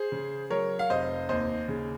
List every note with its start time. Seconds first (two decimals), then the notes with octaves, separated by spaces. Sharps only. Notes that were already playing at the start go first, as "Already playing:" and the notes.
Already playing: G#4 C5
0.12 C#3
0.50 F#3 A#4 C#5
0.79 F5
0.90 F1 C5 D#5
1.29 D#2 C5 D#5
1.68 C#3